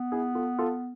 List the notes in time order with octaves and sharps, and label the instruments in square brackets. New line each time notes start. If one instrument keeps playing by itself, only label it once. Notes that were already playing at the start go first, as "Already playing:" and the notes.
Already playing: [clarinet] B3
[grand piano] E4 G#4
F4 A4
F4 A4